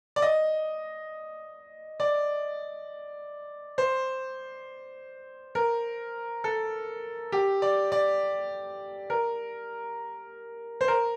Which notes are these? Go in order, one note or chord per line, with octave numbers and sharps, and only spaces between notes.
D5
D#5
D5
C5
A#4
A4
G4
D5
D5
A#4
C5
A#4